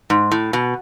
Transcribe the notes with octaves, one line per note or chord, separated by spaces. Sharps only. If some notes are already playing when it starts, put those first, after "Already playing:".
G#2
A2
B2